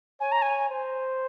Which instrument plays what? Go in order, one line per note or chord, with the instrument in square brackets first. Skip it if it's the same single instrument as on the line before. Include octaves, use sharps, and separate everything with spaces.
[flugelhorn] C#5 [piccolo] G#5
[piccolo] A#5
G#5
[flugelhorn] C5